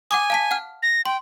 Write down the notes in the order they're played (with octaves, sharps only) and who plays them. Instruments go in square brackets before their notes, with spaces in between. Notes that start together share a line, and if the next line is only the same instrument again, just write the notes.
[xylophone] F#5 D6 D#6 [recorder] G#5
[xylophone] F5 A5 B6
F#5 F6
[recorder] A#6
[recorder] G5 [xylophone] C6